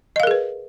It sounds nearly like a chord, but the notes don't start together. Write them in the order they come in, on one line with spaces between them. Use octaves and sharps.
D#5 F5 A#4 G#4 B4